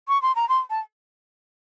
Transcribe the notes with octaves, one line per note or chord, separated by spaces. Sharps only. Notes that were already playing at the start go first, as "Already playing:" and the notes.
C#6
C6
A#5
C6
A5